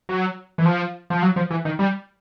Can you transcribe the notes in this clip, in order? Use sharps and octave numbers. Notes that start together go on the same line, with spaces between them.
F#3
E3
F3
F3
F#3
F3
E3
D#3
G3